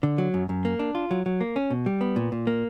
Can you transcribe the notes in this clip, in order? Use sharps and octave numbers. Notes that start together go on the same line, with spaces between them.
D3
F#3
F#2
F#2
A#3
D4
F4
F#3
F#3
A#3
C#4
B2
G3
B3
A#2
A#2
A#3